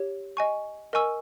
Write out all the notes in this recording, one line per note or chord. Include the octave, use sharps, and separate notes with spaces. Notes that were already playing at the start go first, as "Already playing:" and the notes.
Already playing: G4 C#5
D#5 G#5 C#6
A#4 D#5 G#5 C#6 E6